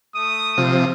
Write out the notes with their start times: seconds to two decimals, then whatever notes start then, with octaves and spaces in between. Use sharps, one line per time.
0.15 A3 D#6
0.57 C3 F3